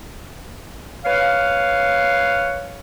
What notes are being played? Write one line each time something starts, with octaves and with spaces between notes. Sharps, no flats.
B4 C#5 F5